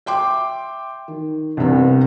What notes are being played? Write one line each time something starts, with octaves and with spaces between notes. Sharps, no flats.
E5 G5 C6 D6
D#3
C2 G2 C3 B3